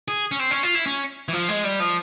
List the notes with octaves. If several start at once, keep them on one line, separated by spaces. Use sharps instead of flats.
G#4
C#4
C4
C#4
F4
E4
C#4
E3
F3
G#3
G3
F3